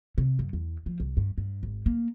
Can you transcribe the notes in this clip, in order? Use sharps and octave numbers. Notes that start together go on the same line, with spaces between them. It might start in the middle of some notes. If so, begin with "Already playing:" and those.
C3
F#2
E2
F3
C2
G2
G2
G#1
A#3